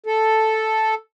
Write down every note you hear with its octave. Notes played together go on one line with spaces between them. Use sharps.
A4